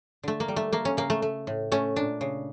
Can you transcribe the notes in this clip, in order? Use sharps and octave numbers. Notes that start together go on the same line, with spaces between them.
D3 A3
A#3
G3
A3
A3 A#3
C#4
C#3 A#3
A3
A3
A2
A3 C#4
A#2 D4
C#3